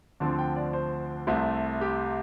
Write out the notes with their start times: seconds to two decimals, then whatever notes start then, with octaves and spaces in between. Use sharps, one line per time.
0.20 D2 D3 F3 C4 A5
0.39 G5
0.56 D5
0.73 C5
1.27 C2 C3 A3
1.81 G4